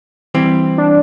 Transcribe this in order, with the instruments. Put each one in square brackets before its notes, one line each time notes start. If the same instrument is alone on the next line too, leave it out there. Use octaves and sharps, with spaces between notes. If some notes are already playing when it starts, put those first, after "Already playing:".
[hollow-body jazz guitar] E3 G3 C4
[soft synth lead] D4